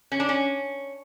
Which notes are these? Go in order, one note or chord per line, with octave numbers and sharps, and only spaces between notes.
C#4
D4
C#4